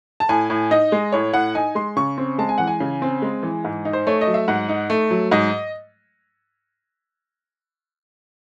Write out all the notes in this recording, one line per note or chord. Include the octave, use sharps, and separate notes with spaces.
A5
A2 G#5
A2
D#4 D#5
G#3
A2 C#5
A2 F#5
D#4 G#5
G#3 C6
C#3 C#6
C4
G#3 A5
G#5
E3 F#5
G#5
C#3
C4
G#3
E3
G#2
D#4
C5
A3 C#5
D#5
F#3
E5
G#2 F#5
D#4
A3
F#3
G#2 D#5